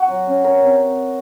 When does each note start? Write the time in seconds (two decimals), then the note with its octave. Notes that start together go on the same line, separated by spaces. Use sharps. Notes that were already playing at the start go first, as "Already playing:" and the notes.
Already playing: F#4
0.08 F#3
0.27 C#4
0.44 C#4 A#4
0.61 C3